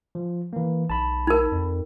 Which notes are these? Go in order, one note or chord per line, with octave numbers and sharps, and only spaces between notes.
F3
E3 A#3
B1 A5 B5
D#4 A#4
F2